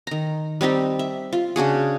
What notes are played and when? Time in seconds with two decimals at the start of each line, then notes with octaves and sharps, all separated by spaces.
0.07 D#3 A#5
0.61 G3 C4 D#4 G4
0.99 E5
1.33 F4
1.56 C#3 D4 F#4 G#4